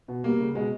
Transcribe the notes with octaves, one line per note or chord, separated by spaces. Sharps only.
B2
G3 A#3
C#3
B2 G#3